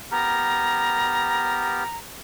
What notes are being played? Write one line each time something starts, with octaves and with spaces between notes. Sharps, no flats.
B3 G4 A#4 A#5